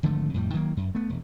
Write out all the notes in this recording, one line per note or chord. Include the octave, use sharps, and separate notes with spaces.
G#1 D3 F3 A3
F2 A2 G3
D#3 F#3 A3 A#3
F#2
A3 B3
E1